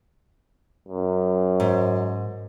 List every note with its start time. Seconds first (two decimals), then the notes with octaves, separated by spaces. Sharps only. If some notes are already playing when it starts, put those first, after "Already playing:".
0.88 F#2
1.60 G#2